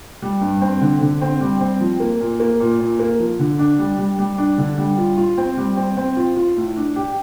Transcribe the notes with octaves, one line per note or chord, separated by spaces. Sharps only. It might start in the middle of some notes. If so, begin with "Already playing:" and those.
G3
G2
C4
D3
D3
C4
G3
C4
F3
A#3
A#2
A#3
A#2
A#2
A#3
F3
D3
D4
G3
G3
G3
D4
D3
G3
F4
F4
C4
G3
C4
C4
F4
F4
A2
D4
G4